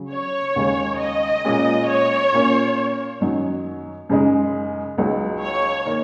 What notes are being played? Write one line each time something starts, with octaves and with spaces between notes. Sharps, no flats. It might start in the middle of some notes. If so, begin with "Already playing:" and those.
Already playing: C#3 F#3
C#5
D#2 C#3 G#3
D#5
A#2 G#3 C#4
C#5
A#2 A#3 C#4
F#2 D#3 F#3 D#4
F#2 C#3 G#3 D#4
C#2 C#3 F#3 D#4
C#5
D#3 A#3